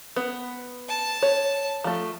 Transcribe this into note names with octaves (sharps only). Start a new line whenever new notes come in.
B3
A5
C#5
F3 A3